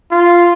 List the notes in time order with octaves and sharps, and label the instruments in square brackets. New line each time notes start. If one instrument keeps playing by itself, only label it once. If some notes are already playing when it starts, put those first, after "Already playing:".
[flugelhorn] F4